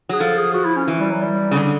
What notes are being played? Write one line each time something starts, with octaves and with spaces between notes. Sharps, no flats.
F#3 G#4
F3 A4
G#4
F#4
E4
C#4
E3
G3
F#3
G3
C#3
D3 G3